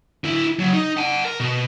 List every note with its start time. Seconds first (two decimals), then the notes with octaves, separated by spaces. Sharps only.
0.24 D3 E4
0.59 C#3 F#3
0.73 D#4
0.97 F#5 A5
1.25 A#4
1.40 B2